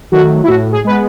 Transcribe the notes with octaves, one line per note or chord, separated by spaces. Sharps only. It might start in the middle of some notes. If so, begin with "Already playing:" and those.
D#3 F#3 A3 F#4
E4
A2 F#4
G#4
G#3 B3 B4